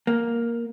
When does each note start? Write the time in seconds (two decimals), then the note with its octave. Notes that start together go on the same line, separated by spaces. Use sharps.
0.07 A#3